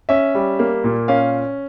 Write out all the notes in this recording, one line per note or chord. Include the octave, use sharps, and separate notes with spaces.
C#4 E5
G3
A#3
A#2
C#4 F5